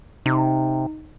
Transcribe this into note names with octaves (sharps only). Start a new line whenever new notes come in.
C3 D#4